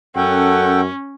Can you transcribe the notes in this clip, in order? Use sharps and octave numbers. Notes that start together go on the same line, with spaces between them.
F#2 C#4 A4 F#5 G5